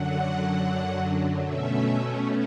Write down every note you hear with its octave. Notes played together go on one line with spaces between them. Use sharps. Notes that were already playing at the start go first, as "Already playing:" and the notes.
Already playing: F#2 D3 F#3 F#5
B2 A3 C#4 E5